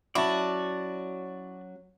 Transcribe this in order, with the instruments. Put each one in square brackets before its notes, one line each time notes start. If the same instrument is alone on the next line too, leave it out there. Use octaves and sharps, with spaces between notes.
[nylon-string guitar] F#3 C#4 [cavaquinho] E4 [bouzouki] F#4 [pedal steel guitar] D5 A5